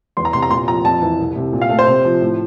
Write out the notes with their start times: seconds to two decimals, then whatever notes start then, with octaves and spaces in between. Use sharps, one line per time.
0.17 E2 C6
0.25 A#5
0.33 C3 C6
0.42 A#5
0.51 A#2 C6
0.68 F3 A#5
0.85 F2 A5
1.02 E3
1.20 C2
1.36 C3
1.53 A#2
1.62 F5
1.70 A3
1.79 C5
1.87 C3
2.05 F3
2.21 A2